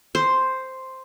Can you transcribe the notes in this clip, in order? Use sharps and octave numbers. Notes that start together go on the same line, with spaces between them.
C5